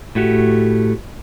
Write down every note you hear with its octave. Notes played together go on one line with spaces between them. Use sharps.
A2 A3 F#4 G4